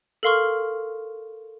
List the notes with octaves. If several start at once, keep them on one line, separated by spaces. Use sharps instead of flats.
A4 A#4 F5 C6 C#6 F6